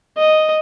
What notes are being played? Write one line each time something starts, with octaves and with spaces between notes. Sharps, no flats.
D#5